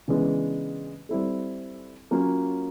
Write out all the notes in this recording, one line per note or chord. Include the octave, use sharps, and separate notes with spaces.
C#3 E3 G#3 B3 D4
G3 C4 E4 A4
F#3 A#3 C#4 F4